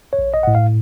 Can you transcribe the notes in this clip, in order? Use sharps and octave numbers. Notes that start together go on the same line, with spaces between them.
C#5
A#1
D#5
A2 F#5
F5